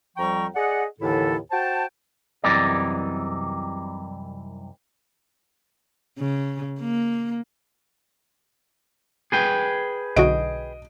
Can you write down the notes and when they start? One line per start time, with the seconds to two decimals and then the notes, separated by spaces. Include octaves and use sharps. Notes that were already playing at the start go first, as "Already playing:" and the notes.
0.17 F2 F3 G3 G5 A#5 C#6
0.55 G#4 D5 D#5 F#5
1.01 D#2 A2 D3 E3 E4 A4
1.51 F#4 C5 G5 A5
2.44 C2 F#2 C3 E3 D#4 D5
6.19 C#3
6.80 A#3
9.32 G#4 B4 G5
10.16 B1 D3 F#4 D#5 D7